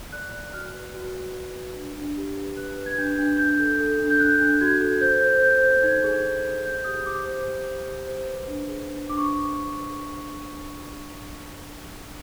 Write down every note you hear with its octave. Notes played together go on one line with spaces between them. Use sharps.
D5 F#6
D5
F#4 F6
B4
F#4
B4
B4
F#4
D4
D4
G4
B4
B4 F#6
B4
G#6
D4 G6
D4
D4 G6
A4
A4
D4
G6
D4 F#6
D4
F#4 G#6
A4
C5 G6
C5
C5 G6
C5
D#4 G#6
G#4
G#4
C5
C5 G6
G4 D#6
G4 D6
C5
G4
C5
G4
C5
B4
D4
G#4
D4
D4 D6
C#6